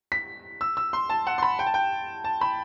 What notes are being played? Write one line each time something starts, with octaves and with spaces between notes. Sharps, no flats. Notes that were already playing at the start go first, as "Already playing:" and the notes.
B6
E6
E6
C6
A5
F#5
C6
B5
G5
A5
G5
A5
B5